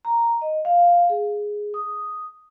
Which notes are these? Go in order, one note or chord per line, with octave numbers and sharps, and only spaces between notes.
A#5
D#5
F5
G#4
D#6